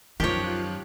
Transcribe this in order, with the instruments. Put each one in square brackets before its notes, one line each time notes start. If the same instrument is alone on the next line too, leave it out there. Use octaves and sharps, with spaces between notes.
[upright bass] F#2 F#3 [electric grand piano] D#3 F3 [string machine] F4 F#6 [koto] G4 C#5